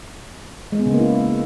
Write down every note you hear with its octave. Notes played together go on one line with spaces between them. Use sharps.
G#3
B3
C#3
A#3
E4